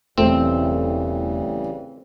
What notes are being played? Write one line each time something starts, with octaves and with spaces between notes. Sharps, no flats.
E1 E2 C#3 E3 G3 A3 C4